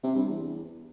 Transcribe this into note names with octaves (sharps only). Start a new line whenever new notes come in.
C3
G2
E2